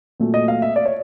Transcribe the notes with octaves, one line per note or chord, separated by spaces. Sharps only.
A#2 F#3 A3
D#5
F5
E5
D5
C#5